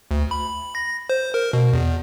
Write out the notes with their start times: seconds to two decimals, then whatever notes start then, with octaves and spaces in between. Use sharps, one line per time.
0.11 D2
0.31 B5
0.75 A#6
1.10 C5
1.34 A#4
1.53 B2
1.73 E2